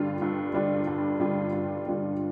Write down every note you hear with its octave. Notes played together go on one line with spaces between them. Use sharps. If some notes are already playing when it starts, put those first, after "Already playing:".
Already playing: G2 D3 G3 D4 F4
G2
D3 G3 D4 F4
G2
D3 G3 D4 F4
G2
D3 G3 D4 F4